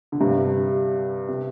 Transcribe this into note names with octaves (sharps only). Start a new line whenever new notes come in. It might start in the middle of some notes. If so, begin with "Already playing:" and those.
D3
G2 C3
C3